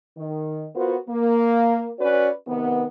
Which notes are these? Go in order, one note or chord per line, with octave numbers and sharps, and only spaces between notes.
D#3
B3 F4 F#4 A#4 C5
A#3
C#4 F#4 B4 C#5 D5
C3 D#3 B3